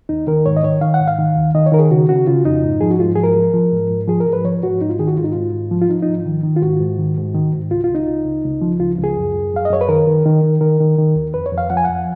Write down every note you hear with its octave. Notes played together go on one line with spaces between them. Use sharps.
D#2 D#4
D#3 A#4
G#2 C#5
D#5
D#3 C#5
D#3 F5
F#5
G#2
F5
D#3
D#2
D#3 D#5
C#5
D#3 A#4
G#4
C#3 F#4
C#3 F#4
C#3 F4
F2 D#4
G#2
F3 G#4
F#4
G#2 F4
F3 G#4
A#4
F3
F3
G#2
G#2
F3 G#4
A#4
G#2
B4
F3 C#5
G#2 F#4
G#2 D#4
F4
D#3 G#4
F#4
G#2 F4
D#4
G#2 F4
G#2
F3
F4
F3 D#4
D#4
G#2
D#3
D#3
F4
G#2 F#4
G#2
D#3
G#2
D#3
G#2
C#2 F4
F4
C#2
D#4
C#2
C#2
C#2
F3
C#2 F4
C#2 G#4
F#2
F#2
F#2 F5
D#5
F#2 C#5
B4
D#3 A#4
D#3
D#3
D#3
D#3 A#4
D#3
D#3
D#2
F2 B4
C#5
F2
F5
F3 F#5
G#5
F2 F#5